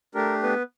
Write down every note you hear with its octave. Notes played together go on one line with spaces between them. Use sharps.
A3 D4 G4 A#4
B3 B4